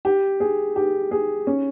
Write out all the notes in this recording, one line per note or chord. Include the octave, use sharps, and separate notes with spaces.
G4
G#4
G4
G#4
C#4